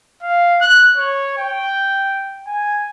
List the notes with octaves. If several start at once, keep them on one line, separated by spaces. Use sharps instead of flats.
F5
F#6
C#5
G5
G#5